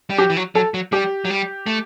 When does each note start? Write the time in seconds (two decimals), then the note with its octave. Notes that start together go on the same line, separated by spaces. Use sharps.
0.10 G3
0.18 F#3 G4
0.30 E3
0.37 F#3
0.55 F#3 A4
0.74 F#3
0.92 G3 G4
1.25 F#3
1.30 G3
1.66 A3